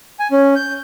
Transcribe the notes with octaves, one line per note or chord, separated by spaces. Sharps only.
G#5
C#4
G6